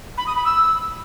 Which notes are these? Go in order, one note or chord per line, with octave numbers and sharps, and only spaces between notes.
B5
D#6
B5
E6